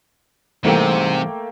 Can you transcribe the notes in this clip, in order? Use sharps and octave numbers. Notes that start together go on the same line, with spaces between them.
G#2 C3 E3 G3 A3 A#3 G5